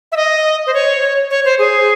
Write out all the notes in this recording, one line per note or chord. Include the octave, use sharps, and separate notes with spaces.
E5
D#5
C5
C#5
C#5
C5
G#4